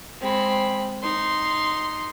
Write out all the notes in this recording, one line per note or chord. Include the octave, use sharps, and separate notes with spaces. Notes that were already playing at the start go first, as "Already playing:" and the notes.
G#3 C4 B5
D#4 C6